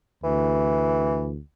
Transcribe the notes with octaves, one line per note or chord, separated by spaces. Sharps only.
D2 E3